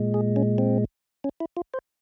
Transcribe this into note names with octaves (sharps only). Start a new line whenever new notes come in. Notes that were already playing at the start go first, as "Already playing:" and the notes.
Already playing: A#2 G#3
G#4
C#4
C4
C#4
E4
F4
C5